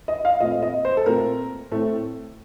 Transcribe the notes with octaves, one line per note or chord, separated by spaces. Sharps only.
D#5
F5
A#2 A3 C4 D#5
D#5
C5
A4
A#2 A3 C4 A#4
A2 A3 C4